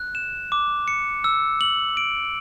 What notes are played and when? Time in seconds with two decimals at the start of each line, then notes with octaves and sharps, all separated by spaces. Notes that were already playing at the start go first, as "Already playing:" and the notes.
Already playing: F#6
0.15 E7
0.52 D6
0.88 C#7
1.24 E6
1.61 F#7
1.97 D7